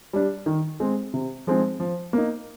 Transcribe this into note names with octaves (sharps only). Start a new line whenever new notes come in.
G3 D4
D#3
G#3 C4
C3
F3 G#3 C4 D#4
F3
A#3 D#4